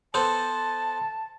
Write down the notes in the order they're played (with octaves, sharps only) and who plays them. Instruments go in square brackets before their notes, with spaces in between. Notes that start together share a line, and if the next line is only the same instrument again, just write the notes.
[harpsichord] B3 A4 C5 [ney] A5